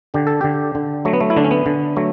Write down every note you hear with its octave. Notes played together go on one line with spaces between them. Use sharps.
D3 G4
A4
D3 G4
D3
F#3 A3
B3
A3
E4
D3 D4
C#4
B3
D3
F#3 A3